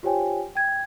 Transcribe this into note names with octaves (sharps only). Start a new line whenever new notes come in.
F4 G4 C5 C#5 G5 G#5
G5 G#6